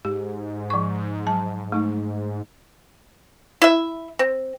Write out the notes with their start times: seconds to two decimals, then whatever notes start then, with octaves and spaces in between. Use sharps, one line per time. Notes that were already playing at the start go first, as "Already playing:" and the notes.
0.05 G#2 G4
0.70 F3 C#6
1.27 F#3 A5
1.72 A3 D#4
3.62 E4 E5
4.19 C4